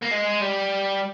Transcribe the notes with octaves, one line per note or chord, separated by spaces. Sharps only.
A#3
G#3
G3